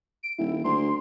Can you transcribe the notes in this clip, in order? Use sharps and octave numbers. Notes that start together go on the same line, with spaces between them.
D7
D#1 E4
D2 C6